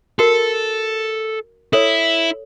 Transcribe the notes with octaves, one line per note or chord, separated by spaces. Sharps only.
F#4 A4 A#4
E4 A4 C#5